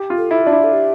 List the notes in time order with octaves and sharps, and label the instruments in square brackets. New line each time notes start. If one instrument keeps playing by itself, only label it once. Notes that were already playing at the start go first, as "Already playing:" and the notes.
Already playing: [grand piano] G4
F4
[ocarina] A4
[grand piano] E4
[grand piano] D4 [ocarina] F4
[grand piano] E4
[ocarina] A4
G4